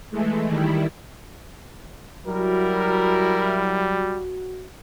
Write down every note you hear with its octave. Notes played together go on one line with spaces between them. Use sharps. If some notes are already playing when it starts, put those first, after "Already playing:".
E3 G#3 A3
D#3 G3 E4
F#3 G3 E4 F#4 A#4